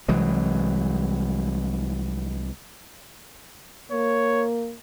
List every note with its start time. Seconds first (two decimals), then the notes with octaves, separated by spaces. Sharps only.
0.08 C2 E3 F#3 G#3
3.92 A#3 C#5